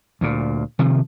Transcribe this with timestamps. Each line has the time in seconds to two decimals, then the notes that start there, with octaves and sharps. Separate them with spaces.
0.21 D2 A#2
0.79 C3 D#3 F3